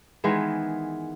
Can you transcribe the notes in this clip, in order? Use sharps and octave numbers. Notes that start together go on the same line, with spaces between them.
D#3 E3 G#3 B3